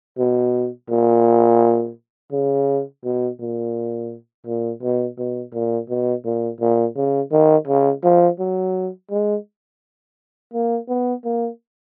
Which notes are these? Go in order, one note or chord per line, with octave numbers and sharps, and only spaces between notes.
B2
A#2
C#3
B2
A#2
A#2
B2
B2
A#2
B2
A#2
A#2
C#3
D#3
C#3
F3
F#3
G#3
A#3
B3
A#3